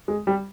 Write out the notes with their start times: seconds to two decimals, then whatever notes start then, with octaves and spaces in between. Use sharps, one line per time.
0.08 G#3
0.27 G3